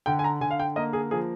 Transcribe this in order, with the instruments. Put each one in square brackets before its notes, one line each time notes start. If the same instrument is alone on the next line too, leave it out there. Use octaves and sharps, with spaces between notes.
[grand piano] D3 G5
G#5
A#5
D3 G#5
F5
G5
A#3 D#5
G#4
F3 G#4